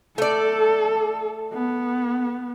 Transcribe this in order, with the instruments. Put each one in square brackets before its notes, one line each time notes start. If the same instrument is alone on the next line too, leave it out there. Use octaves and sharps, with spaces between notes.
[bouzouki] A3 D5 [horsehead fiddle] A4
[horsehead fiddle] B3